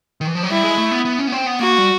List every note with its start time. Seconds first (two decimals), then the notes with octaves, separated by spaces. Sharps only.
0.21 D#3
0.27 E3
0.35 F3
0.43 F#3
0.50 G3 E4
0.63 G#3
0.78 A3
0.92 B3
1.05 B3
1.19 C#4
1.27 B3
1.32 C4
1.46 B3
1.60 A#3 F#4
1.78 G3